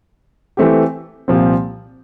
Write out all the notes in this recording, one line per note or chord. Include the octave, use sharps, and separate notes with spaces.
E3 A3 C4 G4
C2 A#2 F3 C4